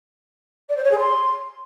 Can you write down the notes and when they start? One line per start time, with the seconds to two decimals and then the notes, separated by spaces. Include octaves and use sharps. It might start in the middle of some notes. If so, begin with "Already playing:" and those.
0.69 D5
0.76 C5
0.84 C#5
0.91 G#4
0.98 C6